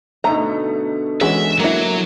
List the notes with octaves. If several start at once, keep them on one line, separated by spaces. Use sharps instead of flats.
B2 D3 A3 D#4 E5 A#5
E3 G#3 C#4 F#4 E5
F#3 A#3 E4